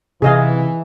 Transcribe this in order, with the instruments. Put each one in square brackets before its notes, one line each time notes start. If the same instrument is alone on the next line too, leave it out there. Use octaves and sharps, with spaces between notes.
[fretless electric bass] C3 [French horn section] E3 [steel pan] G#4 D#5 F5